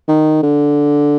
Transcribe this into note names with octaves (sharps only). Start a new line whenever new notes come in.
D#3
D3